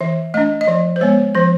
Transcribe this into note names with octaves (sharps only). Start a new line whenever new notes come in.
E3 E5
A3 D4 D#5
D#5
F3 D5
C5
G#3 B3 C#5
F3 C5